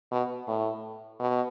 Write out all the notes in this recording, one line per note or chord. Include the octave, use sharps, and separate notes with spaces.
B2
A2
B2